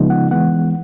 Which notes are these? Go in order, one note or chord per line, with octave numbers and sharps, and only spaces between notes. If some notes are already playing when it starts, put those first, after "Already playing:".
Already playing: C#3 F3 G#3 B3 D#4
F#5
E3 G#3 B3 F#5